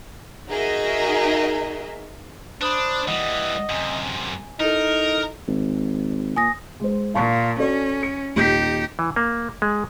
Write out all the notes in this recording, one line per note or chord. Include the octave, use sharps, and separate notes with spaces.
D#4 F#4 G#4 A#4 D#5 E5
D4 C5 B5 D#6 F#6
E3 G3 D#5 F#5
F#2 C3 G#5
D#4 E4 A4 A#4
G#1
A#2 G#5 D#6 A#6
G#3 C5
A#2 F5 A5 C#6
C#4 F#4 A4 D5
C#7
D#1 D#4 G4 G6 B6
E3
A#3
G#3